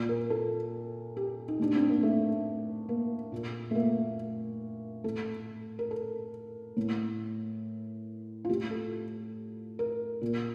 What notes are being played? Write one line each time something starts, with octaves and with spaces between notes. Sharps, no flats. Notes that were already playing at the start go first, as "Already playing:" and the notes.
Already playing: A#2
A#4
A4
G4
D#4
A2 D4
C4
A#3
A3
A#3
A#2
A3
A#3
A2 A4
A#4
A4
A2
F4
A2 G4
A4
A#4
A#2